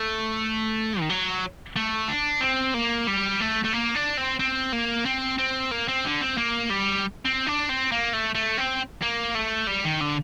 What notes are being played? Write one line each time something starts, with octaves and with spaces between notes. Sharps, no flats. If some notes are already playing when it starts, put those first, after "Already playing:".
Already playing: A3
D#3
F#3
A3
D4
C4
A#3
G3
A3
A3
A#3
D4
C4
C4
A#3
C4
C4
A#3
C4
D3
C4
A#3
G3
C4
D4
C4
A#3
A3
A3
C4
A#3
A3
G3
D#3
D3